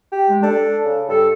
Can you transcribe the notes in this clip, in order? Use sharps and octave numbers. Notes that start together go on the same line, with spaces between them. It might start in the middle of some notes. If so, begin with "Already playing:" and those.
G4
G#3
D4 A4
C#3
G2 A4